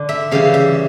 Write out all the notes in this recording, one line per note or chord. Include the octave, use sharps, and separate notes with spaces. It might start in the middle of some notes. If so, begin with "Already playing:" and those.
Already playing: D3
E5
C#3 E3 G3 F5
E5